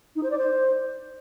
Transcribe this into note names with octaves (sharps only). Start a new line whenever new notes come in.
D#4
C5
D5
C5